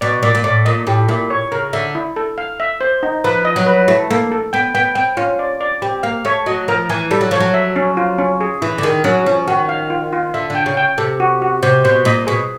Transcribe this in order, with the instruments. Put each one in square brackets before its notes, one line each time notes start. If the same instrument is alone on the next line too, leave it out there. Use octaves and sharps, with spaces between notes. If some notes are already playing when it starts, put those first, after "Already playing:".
[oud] B2 [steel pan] D5
[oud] A#2 [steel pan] D5
[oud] A#2
[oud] A2 [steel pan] D5
[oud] A#2 [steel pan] D#5
[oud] A2 [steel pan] G4
[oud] A#2 [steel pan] E4
[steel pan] C#5
[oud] C#3 [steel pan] A#4
[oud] D3 [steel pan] E5
[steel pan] E4
A4
F5
E5
C5
D#4
[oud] F3 [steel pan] B4
[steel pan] D#5
[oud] F#3
[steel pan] B4
[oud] A3 [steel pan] E4
[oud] A#3 [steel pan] A4
[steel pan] A4
[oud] B3 [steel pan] G5
[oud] B3 [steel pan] G5
[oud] C4 [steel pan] G5
[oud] C#4 [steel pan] F4
[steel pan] D5
D5
[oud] C4 [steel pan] G4
[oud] A#3 [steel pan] F5
[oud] A3 [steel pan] C#5
[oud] F#3 [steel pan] D#5
[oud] F3 [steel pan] A#4
[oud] E3 [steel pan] G#5
[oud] G3 [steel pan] A4
[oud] F#3
[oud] F3 [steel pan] C#5
[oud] F#3
[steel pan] E5
C#4
F4
C#4
G#4
[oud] E3 [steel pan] E4
[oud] D3
[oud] D#3 [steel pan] G#4
[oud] F#3 [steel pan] C#4
[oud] F3 [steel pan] C#4
[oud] D#3 [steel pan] F#4
[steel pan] F5
F4
F4
[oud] D3 [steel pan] E5
[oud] D3
[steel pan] G5
[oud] C#3
[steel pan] G5
[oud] C3 [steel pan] A4
[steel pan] F#4
F#4
[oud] C3 [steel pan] C5
[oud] B2 [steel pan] C5
[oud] A#2 [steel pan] D#5
[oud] B2 [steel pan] G#4